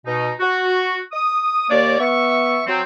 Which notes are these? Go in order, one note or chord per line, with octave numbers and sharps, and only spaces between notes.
B2 D#4
F#4
D#6
D#2 A#3 C#5 D5
B3 E5 C#6
F#3 C4